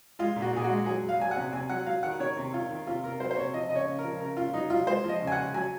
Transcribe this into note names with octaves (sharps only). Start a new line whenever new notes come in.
G#3 F4
A#2
F#4
A#2 G#4
F#4
G#3
F#3 G#4
F#3
F5
F#3 G#5
F#5
C3
C3 G#5
F#3 F#5
F#3 F5
D#3 F#5
D#3 C#5
C3
D#3 F4
D#3
C3 F4
C3 A#4
F#3 C5
C5
C3 C#5
F3 D#5
C#3 D#5
C#5
C#3
F3 A#4
C#3 A#4
C#3 F4
F#3 D#4
F#3 F4
G#3 C5
F3 D#5
C#3
G#5
F#5
C#3
F#3 G#5